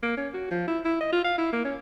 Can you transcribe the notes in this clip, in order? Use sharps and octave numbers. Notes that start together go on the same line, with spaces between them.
A#3
C#4
F#4
F3
E4
E4
D#5
F4
F5
E4
A#3
C#4